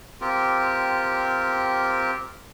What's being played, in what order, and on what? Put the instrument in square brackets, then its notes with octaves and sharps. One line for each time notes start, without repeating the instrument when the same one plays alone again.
[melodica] C4 F4 G4 A#4